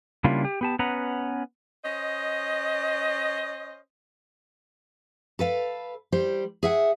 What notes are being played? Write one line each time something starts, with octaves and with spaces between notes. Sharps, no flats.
C#3 G3 A#3 D4 E4 F4
G4
B3 G4 A5
B3 C#4 B4 F#5 A#5
C#4 C5 D#5
A4 B4 F5
G3 C5
G#4 E5 F#5